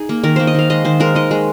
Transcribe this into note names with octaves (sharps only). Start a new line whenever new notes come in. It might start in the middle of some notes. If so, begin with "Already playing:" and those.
Already playing: D#4 G#4
A#3
D#3 A#4
A#3 C5
D#5
D#3 F5
G#3 D#5
D#3 C5
G#3 A#4
D#3 D#5
G#3